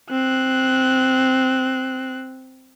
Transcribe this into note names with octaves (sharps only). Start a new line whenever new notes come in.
C4 F#6